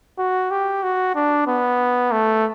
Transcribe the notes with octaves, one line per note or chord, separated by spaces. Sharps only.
F#4
G4
F#4
D4
B3
A3